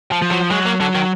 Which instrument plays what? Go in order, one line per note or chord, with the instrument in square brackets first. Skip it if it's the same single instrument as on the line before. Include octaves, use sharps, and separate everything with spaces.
[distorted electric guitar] F3
[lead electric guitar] F3
[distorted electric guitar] F#3
[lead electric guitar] F#3 [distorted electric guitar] G#3
[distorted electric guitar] A#3
[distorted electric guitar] D3 [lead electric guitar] F#3
[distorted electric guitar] D#3